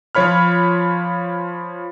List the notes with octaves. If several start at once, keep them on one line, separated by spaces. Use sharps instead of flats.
F3 F4 C#5 B5 F6